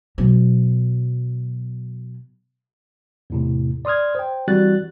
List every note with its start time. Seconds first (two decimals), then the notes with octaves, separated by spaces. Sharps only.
0.18 B2 F#3
3.30 E2 A2 C3
3.85 D5 C6 D#6 F6 G#6
4.15 C5 G5
4.48 E3 G3 C4 F#4 F#6 A6